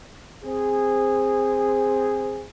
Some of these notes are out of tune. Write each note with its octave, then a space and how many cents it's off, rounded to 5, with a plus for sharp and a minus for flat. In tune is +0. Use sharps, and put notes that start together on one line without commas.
C4 +0 G#4 -15